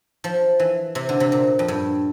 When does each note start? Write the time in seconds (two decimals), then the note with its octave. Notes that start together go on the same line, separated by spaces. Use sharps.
0.24 F3
0.60 E3
0.95 C3
1.09 D3
1.20 C3
1.32 A#2
1.59 F2
1.68 G2